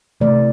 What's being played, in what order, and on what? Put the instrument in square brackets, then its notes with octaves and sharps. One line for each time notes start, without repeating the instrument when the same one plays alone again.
[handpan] C3 E3 A3 D5